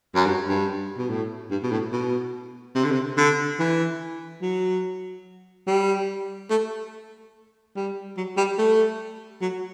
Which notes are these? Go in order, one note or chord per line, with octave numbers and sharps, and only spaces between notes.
F#2
G2
G2
B2
A2
G2
B2
A2
B2
C3
D3
C3
D3
E3
F#3
G3
A3
G3
F#3
G3
A3
F#3